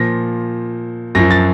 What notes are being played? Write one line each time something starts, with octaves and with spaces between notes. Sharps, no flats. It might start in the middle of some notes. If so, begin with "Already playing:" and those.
Already playing: A#2 F3 A#6
F#2 F3 A#6
A6